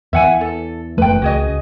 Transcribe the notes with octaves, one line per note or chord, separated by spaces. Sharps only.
E2 E3 E5 F#5 G#5
A4
F#1 E3 A3 B4 G5
C#2 F#4 G#4 D#5